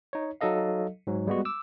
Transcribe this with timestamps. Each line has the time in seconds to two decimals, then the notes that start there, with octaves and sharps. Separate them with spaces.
0.13 D#4 C#5
0.41 F#3 D#4 A4 D#5 F5
1.07 G#2 F#3
1.27 G3 G#3 B3 F#4
1.45 D6 E6